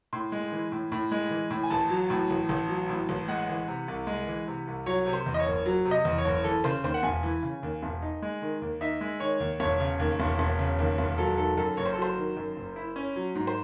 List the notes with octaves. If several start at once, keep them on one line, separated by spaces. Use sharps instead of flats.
A2 C6
G#3
E3
A2
A2
G#3
E3
A2
G#5
A1 A5
F#3
A2
A1
A1
F#3
A2
A1
G#3 F#5
E3
C3
C2
G#3
E3
C3
C2
F#3 C#5
C3
C5
E2
D#5
C#5
F#1
F#3
C3
D#5
E2
C#5
F#1
E3 A4
C#3 C5
D#2 C5
F#5
E1 G#5
E3
C#3
D#2
E1
D#4
G#3
D#3
D#2
D#4 E5
G#3
D#3 C#5
D#2
E1 C#5
C#3
D#2
E1
E1
C#3
D#2
E1
F#3 A4
D#3 A4
F#2 A4
F#1 C#5
C5
A4
F#3 C5
D#3
F#2
F#1
E4
C#4
F#3
G#2
C5